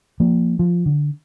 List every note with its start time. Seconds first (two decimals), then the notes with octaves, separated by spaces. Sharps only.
0.20 F3 A#3
0.59 F3
0.86 D3